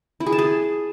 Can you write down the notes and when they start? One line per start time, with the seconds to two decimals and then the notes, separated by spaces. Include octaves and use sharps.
0.20 E4
0.26 G#4
0.32 A5
0.39 G#4